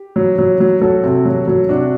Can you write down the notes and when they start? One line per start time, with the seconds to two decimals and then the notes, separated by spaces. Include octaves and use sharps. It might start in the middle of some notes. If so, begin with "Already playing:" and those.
Already playing: G4
0.16 F#3
0.38 F#3
0.60 F#3
0.81 F#3 F#4 A4
1.03 C3
1.25 F#3
1.47 F#3
1.69 C3 D4 F#4